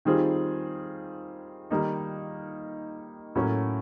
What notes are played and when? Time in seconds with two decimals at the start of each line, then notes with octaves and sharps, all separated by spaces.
0.05 D#3 G3 C4 F4 G#4
1.70 D#3 G3 A#3 D#4
3.35 A2 F#3 A#3 C#4